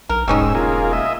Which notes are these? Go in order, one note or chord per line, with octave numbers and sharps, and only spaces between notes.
B1 A#4
E1 G#2 G3 C#4 D#4 E6
A#3 F4 G#4
D#5 E5